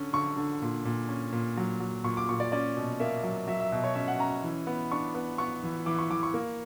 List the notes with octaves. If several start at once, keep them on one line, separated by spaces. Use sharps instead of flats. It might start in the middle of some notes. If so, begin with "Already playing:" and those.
Already playing: D3 C#4
D3 C#6
D3
A#2
A#2
C#4
A#2
F#3
F#3
A#2 C#6
D6
A#2 C#6
D5
C#4 D5
B2
A#3 E5
F#3
F#3 E5
E5
B2
C#5
C#4 E5
F#5
C#4 A#5
E3
B3
D4 C#6
B3
B3 C#6
E3
E3 D6
C#6
E3 D6
C#6
A#3